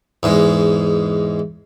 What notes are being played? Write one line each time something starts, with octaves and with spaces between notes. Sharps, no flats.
E2 G#2 G#3